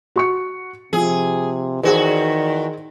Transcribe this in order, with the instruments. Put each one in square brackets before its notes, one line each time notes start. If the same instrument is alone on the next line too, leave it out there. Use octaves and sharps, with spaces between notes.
[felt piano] F#4 C#6 C#7
[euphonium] C3 [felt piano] F3 [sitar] G#4
[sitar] E2 F#4 [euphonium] D#3 [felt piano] G#4 C5